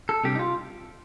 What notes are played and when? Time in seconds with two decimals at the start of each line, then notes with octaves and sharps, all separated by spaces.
0.09 A4
0.24 C3 G3 D4 G4
0.35 D#4
0.39 F4